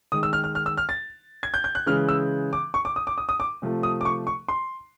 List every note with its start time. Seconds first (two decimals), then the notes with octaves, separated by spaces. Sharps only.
0.12 D#3 G#3 D#6
0.23 E6
0.33 F6
0.44 F6
0.55 F6
0.66 E6
0.77 F6
0.89 A6
1.43 G#6
1.54 G6
1.64 G6
1.75 F#6
1.86 C#3 E3 G#3 F6
2.09 E6
2.53 D6
2.74 C#6
2.85 D6
2.96 D#6
3.07 D6
3.18 D#6
3.29 D#6
3.40 D6
3.62 C3 F3 A3
3.83 D#6
4.01 D6
4.05 C#6
4.27 C#6
4.49 C6